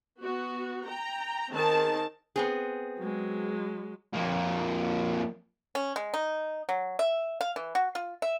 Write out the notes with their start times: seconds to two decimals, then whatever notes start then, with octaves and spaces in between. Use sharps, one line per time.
0.21 B3 F#4
0.86 G5 A#5
1.52 D#3 C4 G#4 A5
2.36 B3 C4 G#4
2.99 F#3 G#3
4.14 F2 A#3
5.75 C#4
5.96 G#3
6.14 D#4
6.69 F#3
6.99 E5
7.41 F5
7.56 E3
7.75 F#4
7.95 F4
8.22 E5